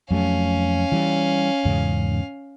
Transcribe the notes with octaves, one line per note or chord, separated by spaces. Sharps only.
F2 F#3 A3 C#4 F5
E3 G3
E2 G#2 C#3